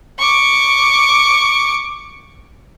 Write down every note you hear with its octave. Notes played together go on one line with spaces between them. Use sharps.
C#6 D6